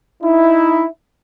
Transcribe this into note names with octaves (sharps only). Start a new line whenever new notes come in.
D#4 E4